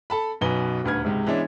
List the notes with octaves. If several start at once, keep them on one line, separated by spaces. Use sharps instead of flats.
A4 A5 B5
B1 F#2 B2 B4 G#5 G7
D#1 D2 B4 F6 G#6
C#2 G#2 C3
E3 G#3 B3 C#4 D4 E4